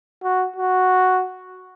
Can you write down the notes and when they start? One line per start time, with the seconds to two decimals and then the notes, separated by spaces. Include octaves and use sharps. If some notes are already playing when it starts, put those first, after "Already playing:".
0.23 F#4
0.56 F#4